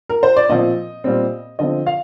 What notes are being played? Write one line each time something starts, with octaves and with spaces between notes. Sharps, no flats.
A#4
C5
D5
A#2 F3 C4 D#5
A#2 G3 C4
D3 F3 C4 D#5
F5